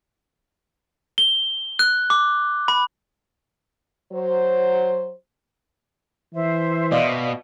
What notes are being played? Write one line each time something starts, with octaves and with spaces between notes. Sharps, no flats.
G7
F#6
D6
B5
F#3 C5
E3 C5 E5
B2 D5 D#5 F5